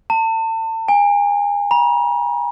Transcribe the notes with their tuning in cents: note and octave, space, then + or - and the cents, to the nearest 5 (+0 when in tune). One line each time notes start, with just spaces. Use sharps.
A5 +35
G#5 -30
A#5 +45